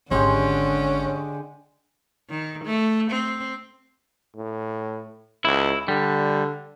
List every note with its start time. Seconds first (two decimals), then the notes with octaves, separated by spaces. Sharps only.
0.11 G#1 D3 G#3 C#4 G4
2.30 D#3
2.65 A3
3.11 C4
4.36 A2
5.45 C#2 E4
5.88 D3 G3